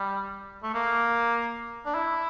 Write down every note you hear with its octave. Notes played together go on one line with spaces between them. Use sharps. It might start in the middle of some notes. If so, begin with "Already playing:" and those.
Already playing: G3
A3
A#3
D4
E4